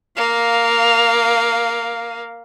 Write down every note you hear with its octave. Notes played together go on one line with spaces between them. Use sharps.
A#3 F5